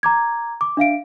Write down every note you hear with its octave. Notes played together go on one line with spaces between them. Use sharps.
A#5 D6 G#6
D6
D4 E5 F5 D7